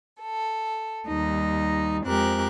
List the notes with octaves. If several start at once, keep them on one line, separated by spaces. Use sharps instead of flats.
A4
D#2 G3 D#4
F2 G#3 C4 G4 A#4 F#6